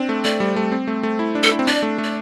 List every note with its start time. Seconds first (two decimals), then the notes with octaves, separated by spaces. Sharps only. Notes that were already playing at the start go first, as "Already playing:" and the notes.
Already playing: C4 D4
0.09 A3
0.24 A3 D5
0.40 G3
0.56 A3
0.72 C4
0.87 A3
1.03 A3
1.19 E4
1.35 D4
1.43 A4
1.51 E4
1.59 C4
1.67 D4 D5
1.83 A3
1.98 A3
2.04 D5